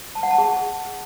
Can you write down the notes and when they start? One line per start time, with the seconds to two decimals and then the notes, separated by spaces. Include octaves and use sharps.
0.15 A5
0.23 F#5
0.31 A5
0.38 G#4